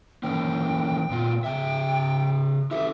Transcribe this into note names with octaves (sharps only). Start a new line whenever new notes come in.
E3 A#3 C#4 G5
A#2 B3 F4
C#3 E5 G5
E4 G4 A4 E5